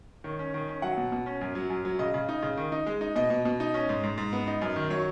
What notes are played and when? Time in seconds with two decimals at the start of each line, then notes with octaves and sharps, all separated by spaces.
0.24 D#3 C#5
0.39 C#4
0.54 D#3
0.68 C#4
0.82 F#3 F#5
0.97 B2
1.12 B2
1.26 C#4
1.41 F#2
1.55 F#3
1.70 F#2
1.85 F#3
1.99 C#3 D#5
2.14 C#3
2.29 D#4
2.43 C#3
2.57 D#3
2.72 D#4
2.86 G#3
3.01 D#4
3.16 B2 D#5
3.30 B2
3.45 B2
3.60 D#4
3.74 C#4
3.89 G#2
4.03 G#2
4.18 G#2
4.33 B3
4.47 D#4
4.62 F#2
4.76 D#3
4.90 F#3 C#5